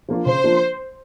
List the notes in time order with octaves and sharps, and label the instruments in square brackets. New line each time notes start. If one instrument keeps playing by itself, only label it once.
[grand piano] F3 A#3 D4 F4
[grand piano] C#3 [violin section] C5
[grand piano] F3 A#3 D4 F4